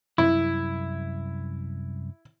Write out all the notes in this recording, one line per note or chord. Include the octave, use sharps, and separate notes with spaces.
C2 F#2 E4